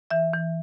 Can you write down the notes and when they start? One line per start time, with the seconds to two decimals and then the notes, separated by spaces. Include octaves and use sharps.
0.11 E3 E5
0.33 E3